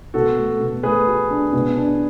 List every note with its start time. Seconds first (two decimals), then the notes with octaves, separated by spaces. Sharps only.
0.14 B2 F#4 A4
0.37 A3
0.60 B2
0.83 A3 G#4 B4
1.07 F#4
1.31 D4
1.53 B2
1.77 D4